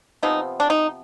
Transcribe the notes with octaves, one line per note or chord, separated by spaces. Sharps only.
C3 F3 B3 D#4
D4
D#4